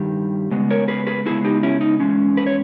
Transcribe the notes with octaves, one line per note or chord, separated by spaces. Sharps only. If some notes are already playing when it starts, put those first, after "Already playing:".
Already playing: G2 D#3 G3
C#3 G#3 B3
A#4 C#5
G#4 B4
G#4 B4
C#3 G#3 B3 E4 G#4
D#4 G4
C#4 E4
D#4
E2 C#3 G#3 C#4
B4
C#5